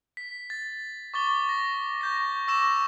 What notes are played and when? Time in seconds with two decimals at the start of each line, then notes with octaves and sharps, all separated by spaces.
0.17 B6
0.50 A6
1.14 C#6 D6 A6 G7
1.49 A#6
2.01 C#6 G6 A#6
2.48 C#6 D6 E6 A#6 E7